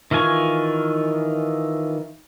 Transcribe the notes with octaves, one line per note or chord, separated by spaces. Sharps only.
D#3 E3 F4 G#5 C#6